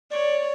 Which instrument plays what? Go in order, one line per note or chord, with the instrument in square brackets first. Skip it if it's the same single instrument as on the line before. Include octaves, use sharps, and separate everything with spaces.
[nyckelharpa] C#5 [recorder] D5